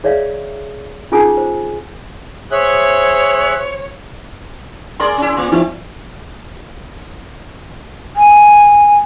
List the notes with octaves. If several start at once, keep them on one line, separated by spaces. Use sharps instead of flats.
G#4 C#5 D5 E5 F5
C#4 D#4 F4 G#4 G#5 D#6
C5
G#4 C5 C#5 E5 F#6
G#4 A#4 D5 C6
C#4 E4
A#3 F4
F3 C4 E4
G#5